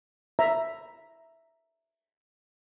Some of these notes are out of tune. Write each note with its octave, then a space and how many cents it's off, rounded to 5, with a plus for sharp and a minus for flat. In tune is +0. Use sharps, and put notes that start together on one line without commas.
E5 +0 A#5 +0